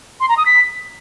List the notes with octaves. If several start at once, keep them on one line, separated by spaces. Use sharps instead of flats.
C6
A#5
D#6
B6